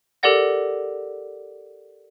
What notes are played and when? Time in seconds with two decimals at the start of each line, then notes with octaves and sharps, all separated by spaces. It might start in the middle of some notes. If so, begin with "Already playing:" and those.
0.23 G4 A4 A#4 D5 F#5 A#6